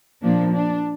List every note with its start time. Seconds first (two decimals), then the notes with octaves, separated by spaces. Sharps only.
0.23 A#2 F3 A#3 D4
0.54 D4